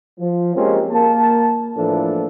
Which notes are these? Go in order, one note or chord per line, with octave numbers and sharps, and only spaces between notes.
F3
G#3 A#3 C4 C#4 F4 G4
A#3 A5
A2 E3 F3 A#3 D4 A4